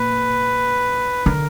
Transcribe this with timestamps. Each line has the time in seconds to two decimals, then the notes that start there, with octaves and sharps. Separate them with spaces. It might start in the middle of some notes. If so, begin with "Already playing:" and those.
Already playing: A#2 B4
1.26 D3 A#4